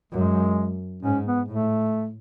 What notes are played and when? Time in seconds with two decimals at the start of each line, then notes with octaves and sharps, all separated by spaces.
0.12 F#2 G#3
1.03 G#2 C#4
1.25 B3
1.48 A2 A3